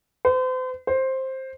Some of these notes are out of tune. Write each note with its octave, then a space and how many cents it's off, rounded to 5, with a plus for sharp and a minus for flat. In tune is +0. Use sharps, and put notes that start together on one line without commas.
C5 -40
C5 +10